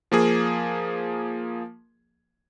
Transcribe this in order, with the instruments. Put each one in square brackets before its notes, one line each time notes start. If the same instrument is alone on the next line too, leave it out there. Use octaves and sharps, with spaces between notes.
[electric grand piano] F3 A#3 G#4